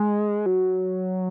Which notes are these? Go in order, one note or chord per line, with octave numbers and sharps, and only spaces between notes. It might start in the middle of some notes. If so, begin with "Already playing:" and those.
Already playing: G#3
F#3